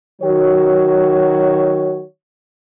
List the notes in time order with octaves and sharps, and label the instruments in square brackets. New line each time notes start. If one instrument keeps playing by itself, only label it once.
[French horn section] D#3 F#3 F#4 C#5